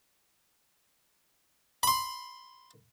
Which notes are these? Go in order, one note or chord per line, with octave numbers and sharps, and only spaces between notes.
B5 C6